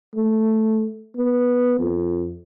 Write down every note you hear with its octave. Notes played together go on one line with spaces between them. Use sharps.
A3
B3
F2